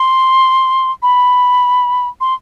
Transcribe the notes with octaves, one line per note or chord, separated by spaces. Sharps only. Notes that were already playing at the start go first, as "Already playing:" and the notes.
Already playing: C6
B5
C6